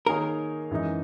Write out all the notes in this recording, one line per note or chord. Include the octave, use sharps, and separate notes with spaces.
D#3 A#3 D#4 G#4 A#4 C#5
F#2 E3 G#3 D#4